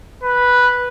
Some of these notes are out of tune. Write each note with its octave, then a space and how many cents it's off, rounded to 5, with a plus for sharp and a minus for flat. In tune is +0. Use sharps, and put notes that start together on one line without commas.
B4 -5